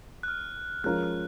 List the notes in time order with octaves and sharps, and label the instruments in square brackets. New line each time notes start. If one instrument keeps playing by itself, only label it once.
[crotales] F#6
F6
[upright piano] F3 G#3 C#4 F4 A#4 [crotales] F#6
[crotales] F6